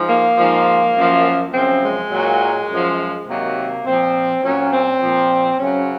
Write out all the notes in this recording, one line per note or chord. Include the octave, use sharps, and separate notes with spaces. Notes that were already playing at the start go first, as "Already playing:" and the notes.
Already playing: G#2 F3
A#3
G#2 F3
F#2 F3
F#2 C#3 F3 C4
G#3
A#2 F#3
F#2 F3
C3 D#3 F#3 A#3
A#2 F3 C4
A#2 F#3 C#4
C4
A#2 F3
F#2 C#3 F#3 C#4